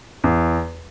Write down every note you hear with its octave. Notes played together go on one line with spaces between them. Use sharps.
E2